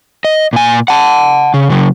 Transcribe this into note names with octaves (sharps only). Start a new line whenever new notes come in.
D#5
A#2 G#5
F#5 A5
C#3
C#3 F#3